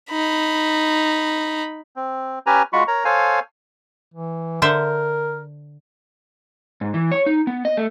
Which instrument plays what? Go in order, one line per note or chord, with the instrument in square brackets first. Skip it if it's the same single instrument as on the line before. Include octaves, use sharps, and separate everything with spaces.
[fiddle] D#4 B5
[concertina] C4
C#4 G4 B4 G#5 A#5
G#3 F4 F#4 B5 C#6
A#4 C#5 A#5
A4 C5 C#5 F5 G#5
[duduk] E3
[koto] D3 C5 E5 [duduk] A#4
[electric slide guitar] G#2
E3
C#5
D#4
B3
D#5
A3